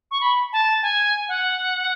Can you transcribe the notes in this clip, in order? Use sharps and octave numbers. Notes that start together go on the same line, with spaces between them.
C#6
B5
A5
G#5
F#5